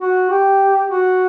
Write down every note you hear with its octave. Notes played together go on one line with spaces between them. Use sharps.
F#4
G4
F#4